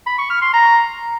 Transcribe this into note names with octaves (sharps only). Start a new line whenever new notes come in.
B5
C#6
F6
C6
A#5